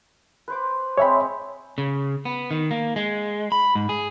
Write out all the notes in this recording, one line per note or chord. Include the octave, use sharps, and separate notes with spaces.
B4 C5 D6
G#3 C4 C#5 E5 B5
C#3
B3
D#3
A#3
G#3
B5
G#2
G#4